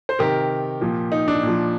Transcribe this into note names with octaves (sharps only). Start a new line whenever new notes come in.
C5
C3 D#3 G4 A#4
A#2 F3
D#4
D4
A#2 F3